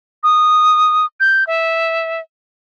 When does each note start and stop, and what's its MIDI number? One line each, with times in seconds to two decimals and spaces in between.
0.23 1.05 87
1.20 1.44 91
1.47 2.20 76